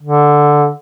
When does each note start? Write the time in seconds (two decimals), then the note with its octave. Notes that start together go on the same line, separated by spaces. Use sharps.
0.02 D3